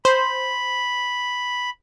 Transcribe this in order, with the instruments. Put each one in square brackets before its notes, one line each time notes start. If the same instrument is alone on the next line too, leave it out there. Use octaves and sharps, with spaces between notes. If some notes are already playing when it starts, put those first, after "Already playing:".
[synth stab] C5 [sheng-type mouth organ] B5